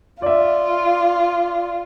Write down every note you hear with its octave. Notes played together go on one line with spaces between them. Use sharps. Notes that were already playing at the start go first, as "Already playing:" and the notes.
F4 D5 E5